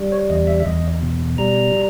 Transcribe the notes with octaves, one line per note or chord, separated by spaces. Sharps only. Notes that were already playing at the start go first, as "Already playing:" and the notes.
Already playing: G3
C#5
E2 D#5
E5
E5
E2 D#5
B2
G3 A#5